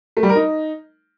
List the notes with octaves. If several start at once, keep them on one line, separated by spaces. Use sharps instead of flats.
A3
G3
A#4
D#4